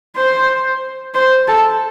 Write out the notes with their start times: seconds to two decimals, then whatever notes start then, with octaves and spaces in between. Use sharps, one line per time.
0.16 C5
1.14 C5
1.47 A4